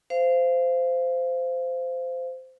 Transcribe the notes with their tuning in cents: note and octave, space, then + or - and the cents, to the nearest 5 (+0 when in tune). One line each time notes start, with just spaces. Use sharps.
C5 -20 F5 -20